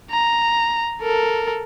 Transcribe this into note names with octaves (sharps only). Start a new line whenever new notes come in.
A#5
A4 A#4